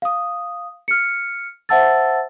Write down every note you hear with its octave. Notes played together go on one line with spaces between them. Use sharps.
F5 D#6
F6 C#7
C5 E5 F#5 A5 E6 A6